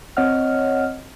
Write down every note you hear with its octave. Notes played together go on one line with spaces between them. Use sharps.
C4 C#5 D#5 F#5 F6